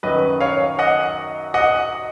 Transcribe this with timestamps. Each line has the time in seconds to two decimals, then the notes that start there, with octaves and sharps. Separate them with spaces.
0.03 F#2 D#3 F#3 B4 D#5
0.40 C#5 F5
0.79 D#5 F#5
1.54 D#5 F#5